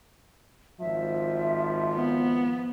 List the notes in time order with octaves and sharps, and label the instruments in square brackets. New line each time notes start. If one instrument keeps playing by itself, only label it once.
[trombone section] G#1 F3 [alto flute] E5
[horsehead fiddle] B3